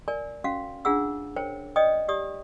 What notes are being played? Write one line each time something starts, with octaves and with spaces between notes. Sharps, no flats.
A#4 D5 G#5
C#4 F#4 F5
D4 F4 G#4 F#5 E6
A#4 C5 C#5 G5
C5 D5 D#5 G5 D#6
G4 D5 D#6